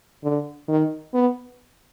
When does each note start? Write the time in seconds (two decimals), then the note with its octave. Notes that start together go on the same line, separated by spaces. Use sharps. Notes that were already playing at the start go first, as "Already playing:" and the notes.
0.24 D3
0.68 D#3
1.14 B3